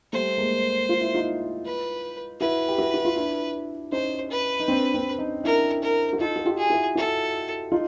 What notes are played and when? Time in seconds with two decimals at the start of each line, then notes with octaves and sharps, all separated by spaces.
0.13 G3 A3 C5
0.38 G#3 A#3
0.89 F4
1.01 E4
1.14 D#4 F4
1.65 B4
2.40 E4 F#4 B4
2.68 G4
2.78 E4 F#4
2.94 F#4
3.05 F4
3.16 D4 E4
3.92 C#4 D#4 C5
4.31 B4
4.60 D#4
4.68 C4 D4
4.94 C4 D4
5.18 C#4 D#4
5.44 D4 E4 A#4
5.83 A#4
6.13 F#4
6.20 D#4 F4 A4
6.36 F#4
6.45 F4 G4
6.58 G#4
6.70 E4 F#4
6.95 E4 F#4 A4
7.72 D#4 F4